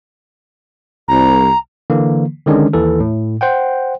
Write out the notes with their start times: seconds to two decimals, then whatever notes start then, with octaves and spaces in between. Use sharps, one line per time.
1.08 C2 A#5
1.90 D3 E3 A#3
2.46 D3 D#3 G#3 C#4 D4
2.73 D#2 E3 A4
3.00 A2
3.41 C5 F#5 G5